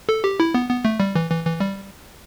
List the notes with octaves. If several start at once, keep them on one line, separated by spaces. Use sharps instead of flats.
A4
G4
E4
B3
B3
A3
G3
E3
E3
E3
G3